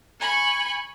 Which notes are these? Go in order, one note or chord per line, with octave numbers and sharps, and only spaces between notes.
G#5 B5 C#6